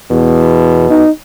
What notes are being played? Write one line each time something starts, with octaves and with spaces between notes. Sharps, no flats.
E2 B2
D#4